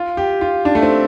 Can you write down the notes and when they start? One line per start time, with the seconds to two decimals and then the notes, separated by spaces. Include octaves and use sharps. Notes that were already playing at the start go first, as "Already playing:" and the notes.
Already playing: F4
0.17 G4
0.41 F4
0.65 D4
0.75 A3
0.82 C4